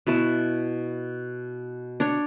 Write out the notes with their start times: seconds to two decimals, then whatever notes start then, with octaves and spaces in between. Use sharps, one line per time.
0.07 B2 E4 A5 C#6
2.00 D4 C#5